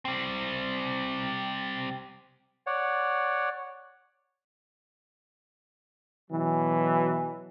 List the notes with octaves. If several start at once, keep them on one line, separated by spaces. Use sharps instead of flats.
G3 C4
C#5 D5 F#5
B2 E3 F#3